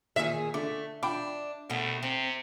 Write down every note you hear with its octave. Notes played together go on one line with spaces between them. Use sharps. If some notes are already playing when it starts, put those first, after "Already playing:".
A#2 D#3 G#4 E5
D3 A3 D6
D4 G5 B5 D6
D#2 B2 A3
C3 C4